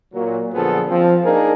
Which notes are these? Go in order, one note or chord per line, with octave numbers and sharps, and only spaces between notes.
A#2 F#3
A#2 D3 F3 B3 G#4 A4
F3 C4
A#3 D4 D#4 G#4 A#4